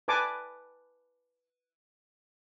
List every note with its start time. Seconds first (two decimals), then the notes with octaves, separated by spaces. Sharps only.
0.08 B4 G#5 A5 D6